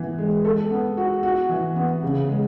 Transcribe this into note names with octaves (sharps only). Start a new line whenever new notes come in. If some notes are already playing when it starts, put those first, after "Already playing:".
Already playing: E3 B3
G#3
A4
B3
F#4
F#4
E3
B3
C#3
G#3